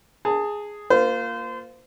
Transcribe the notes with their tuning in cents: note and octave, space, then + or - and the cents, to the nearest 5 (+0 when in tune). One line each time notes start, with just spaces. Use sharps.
G#4 +0 A5 +25
A#3 +0 F4 +0 C5 -30